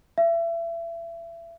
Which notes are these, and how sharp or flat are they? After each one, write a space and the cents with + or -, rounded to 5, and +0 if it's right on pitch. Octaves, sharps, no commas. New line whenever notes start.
E5 +30